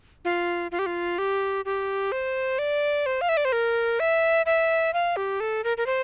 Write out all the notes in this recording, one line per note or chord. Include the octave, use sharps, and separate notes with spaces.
F4
F4
G4
F4
G4
G4
C5
D5
C5
F5
E5
D5
C5
A#4
E5
E5
F5
G4
A4
A#4
A#4
C5